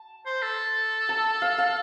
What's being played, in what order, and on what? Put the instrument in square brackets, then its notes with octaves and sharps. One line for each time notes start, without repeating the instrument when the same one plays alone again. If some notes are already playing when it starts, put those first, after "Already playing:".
Already playing: [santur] A5
[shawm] C5
A4
[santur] A5
F5
F5